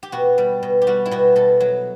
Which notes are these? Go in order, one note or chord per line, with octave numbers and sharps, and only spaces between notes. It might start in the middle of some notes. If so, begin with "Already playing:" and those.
G4
B2 F#4
G3
B2
G4
G3 F#4
E4
B2 F#4
B2 A4
F#3